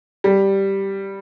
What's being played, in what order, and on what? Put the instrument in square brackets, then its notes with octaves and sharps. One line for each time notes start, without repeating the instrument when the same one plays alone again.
[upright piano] G3